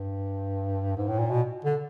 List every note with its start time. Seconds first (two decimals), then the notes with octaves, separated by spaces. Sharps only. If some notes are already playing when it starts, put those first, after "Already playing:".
Already playing: G2
0.97 G#2
1.08 A2
1.19 A#2
1.30 B2
1.65 D3